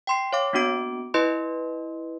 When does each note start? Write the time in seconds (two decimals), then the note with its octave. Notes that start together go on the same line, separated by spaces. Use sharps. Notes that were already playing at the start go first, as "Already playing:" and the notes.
0.07 G5 C6 C7
0.33 C#5 F5 D6
0.53 A#3 B3 D4 F#4 D6 D7
1.14 E4 B4 D#5 C6